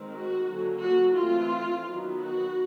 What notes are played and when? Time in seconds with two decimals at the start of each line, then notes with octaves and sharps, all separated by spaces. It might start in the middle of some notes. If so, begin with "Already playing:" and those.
Already playing: D#3 G#3 C4
0.12 F#4
0.46 D3 F#3 A#3 C#4
0.81 F#4
1.16 E3 A3 C4 F4
1.86 D#3 F#3 B3
2.21 F#4